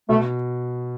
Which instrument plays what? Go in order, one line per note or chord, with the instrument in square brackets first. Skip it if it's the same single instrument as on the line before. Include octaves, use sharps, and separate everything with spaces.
[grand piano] B2 [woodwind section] A3